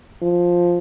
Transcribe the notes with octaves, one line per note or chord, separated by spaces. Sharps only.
F3